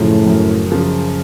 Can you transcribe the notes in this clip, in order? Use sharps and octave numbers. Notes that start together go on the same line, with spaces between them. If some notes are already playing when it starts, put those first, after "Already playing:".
Already playing: F#2 A2 C#3 F3
F#2
C#3 F3